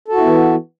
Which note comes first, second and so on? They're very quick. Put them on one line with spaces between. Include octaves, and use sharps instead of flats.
A4 F#4 E4 B3 E3